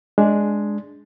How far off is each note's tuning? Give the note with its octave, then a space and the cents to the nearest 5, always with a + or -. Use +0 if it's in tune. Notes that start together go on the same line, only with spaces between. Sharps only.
G#3 +5 D4 +0